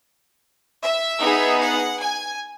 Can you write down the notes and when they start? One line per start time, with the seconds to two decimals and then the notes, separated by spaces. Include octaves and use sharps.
0.82 E5
1.21 B3 D#4 G#4
1.61 F#5
2.00 G#5